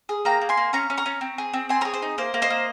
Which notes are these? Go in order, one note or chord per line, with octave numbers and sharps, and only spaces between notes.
G#4
A#3 G5 A#5
A#3
G#5 C6
A#3
C#4 A#5 C#6
C#4
A#5 C#6
C#4
C4
G#4
C4
C4 G#5 C6
G#4 A#4 C#5
C5
D#4
A#3 C5
A#3
C5 D#5
A#3